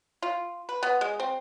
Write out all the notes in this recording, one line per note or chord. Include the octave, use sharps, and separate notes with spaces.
F4
B4
B3
G#3
C4